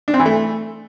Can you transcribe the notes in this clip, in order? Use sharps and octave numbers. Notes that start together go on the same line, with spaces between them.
D4
C4
E3
A3